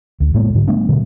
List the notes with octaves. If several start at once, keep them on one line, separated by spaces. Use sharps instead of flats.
D2
A2 G#3 A#3 B3
G#2 D3
G3 A3 B3 D4
B2 D3 G3